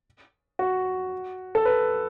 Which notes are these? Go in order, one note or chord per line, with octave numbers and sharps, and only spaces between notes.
F#4
A4
B4